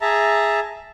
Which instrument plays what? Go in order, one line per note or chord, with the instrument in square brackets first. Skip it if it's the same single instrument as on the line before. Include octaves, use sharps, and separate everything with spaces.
[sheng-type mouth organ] G#4 E5 A5 A#5